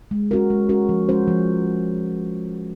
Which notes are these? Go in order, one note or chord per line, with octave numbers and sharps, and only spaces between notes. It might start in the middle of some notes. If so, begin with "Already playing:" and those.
G#3
C#4 F#4 A#4
G#3
C#4 F#4 A#4
F3
G#3 C#4 F#4 C5
F3